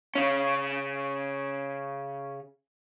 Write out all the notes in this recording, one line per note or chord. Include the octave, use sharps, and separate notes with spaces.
C#3 C#4